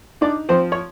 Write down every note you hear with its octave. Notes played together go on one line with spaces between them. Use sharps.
D4 D#4 D5
F3 C4 C5
C#5